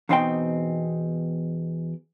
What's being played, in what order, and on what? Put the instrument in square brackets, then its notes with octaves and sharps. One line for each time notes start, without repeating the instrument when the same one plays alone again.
[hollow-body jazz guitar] E2 B2 C4 D#4 G#4 G5